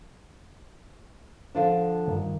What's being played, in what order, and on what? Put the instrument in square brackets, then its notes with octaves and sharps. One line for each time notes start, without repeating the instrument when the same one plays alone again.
[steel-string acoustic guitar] D3 F3 D4
[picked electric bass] G2 D#3